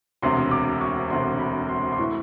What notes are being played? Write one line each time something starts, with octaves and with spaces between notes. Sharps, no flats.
E1 D2 C3 C6
D6
C#6
E1 D2 C3 C6
B5
C6
C6
A2 E3 C#6